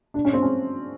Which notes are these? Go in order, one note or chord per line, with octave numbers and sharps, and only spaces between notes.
D4
C#4
C4
C#4